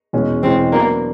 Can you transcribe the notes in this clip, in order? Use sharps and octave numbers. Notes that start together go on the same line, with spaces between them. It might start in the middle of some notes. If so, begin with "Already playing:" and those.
E2 B2 G#3 C#4
E2 B2 G#3 C4 C#4
F#3 A#3 B3 D4